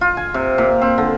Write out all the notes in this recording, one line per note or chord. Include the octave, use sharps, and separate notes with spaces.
F4
G#5
C3
A#2
C4
D3